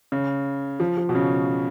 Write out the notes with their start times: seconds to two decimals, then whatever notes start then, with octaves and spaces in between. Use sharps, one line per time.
0.12 C#3
0.80 F3
0.98 F3
1.09 B2
1.15 C#3